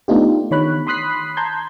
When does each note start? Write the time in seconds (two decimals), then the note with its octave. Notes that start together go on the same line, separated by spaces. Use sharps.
0.08 A3 B3 D4 D#4 F4 G4
0.51 D#3 C#5 B5 F#6
0.87 B5 C6 D#6 F#6 B6 C7
1.37 A5 A#5 C6 G6 G#6